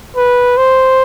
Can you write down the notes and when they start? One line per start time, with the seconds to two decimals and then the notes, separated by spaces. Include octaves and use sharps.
0.16 B4
0.57 C5